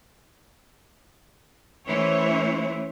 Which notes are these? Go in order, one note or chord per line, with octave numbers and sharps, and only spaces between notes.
E3 A3 C#4 E4 C5 C#5